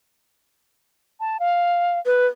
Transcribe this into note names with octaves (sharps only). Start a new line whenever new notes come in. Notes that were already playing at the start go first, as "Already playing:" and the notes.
A5
F5
B4